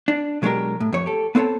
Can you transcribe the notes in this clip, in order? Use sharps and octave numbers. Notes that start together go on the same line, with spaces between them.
D4
B2 F#3 G#3 D4 G4 A#4
A2
F2 C#5
G4 A4
B3 C4 A4 C5 C#5 A5